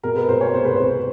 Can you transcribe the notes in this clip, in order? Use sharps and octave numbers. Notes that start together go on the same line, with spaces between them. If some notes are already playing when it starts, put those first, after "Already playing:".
B2 A#4
B4
B2 C5
C#5
C2 C5
B4
C2 C5